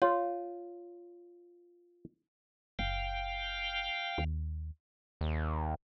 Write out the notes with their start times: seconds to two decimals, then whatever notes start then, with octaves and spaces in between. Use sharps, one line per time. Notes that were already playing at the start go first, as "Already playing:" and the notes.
0.02 F4 C#5
2.79 F#1 F5 G5
4.18 D#2
5.21 D#2